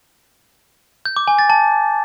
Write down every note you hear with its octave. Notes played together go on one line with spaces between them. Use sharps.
G6
D6
G#5
A6
A5